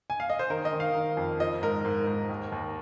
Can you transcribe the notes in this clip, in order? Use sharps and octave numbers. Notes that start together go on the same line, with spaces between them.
G#5
F5
D#5
C5
D#3 A#4
D#5
D#3
F5
D#3
F2
F3 D#5
G#2 A#4
G#2
G#2
D#2
D#2